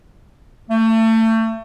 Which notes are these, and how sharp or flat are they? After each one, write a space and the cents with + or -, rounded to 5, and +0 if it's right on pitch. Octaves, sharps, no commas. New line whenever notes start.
A3 +30